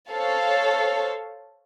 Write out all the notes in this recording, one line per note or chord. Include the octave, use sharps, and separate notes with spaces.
A4 C5 C#5 F5 A5